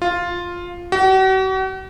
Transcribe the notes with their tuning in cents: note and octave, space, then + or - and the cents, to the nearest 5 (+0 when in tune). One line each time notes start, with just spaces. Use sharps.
F4 +5
F#4 +45